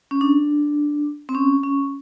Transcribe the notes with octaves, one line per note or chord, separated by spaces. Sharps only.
C#4
D4
C4
C#4
C#4